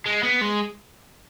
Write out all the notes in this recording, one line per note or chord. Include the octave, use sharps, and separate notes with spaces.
G#3
B3
G#3